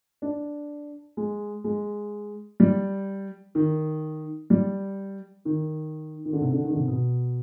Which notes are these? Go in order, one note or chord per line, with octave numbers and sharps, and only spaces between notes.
D4
G#3
G#3
G3
D#3
G3
D#3
D#3
D3
C3
D3
D#3
D3
C3
B2